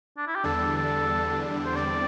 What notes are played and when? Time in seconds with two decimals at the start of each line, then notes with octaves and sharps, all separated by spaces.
0.18 D4
0.27 E4
0.35 G4
0.44 E2 D3 G3 D4 A4
0.77 A4
1.65 C5
1.76 E2 D3 G3 C4 D5